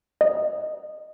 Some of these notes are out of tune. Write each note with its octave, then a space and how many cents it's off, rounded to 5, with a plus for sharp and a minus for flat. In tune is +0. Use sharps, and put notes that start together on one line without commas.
D#5 -15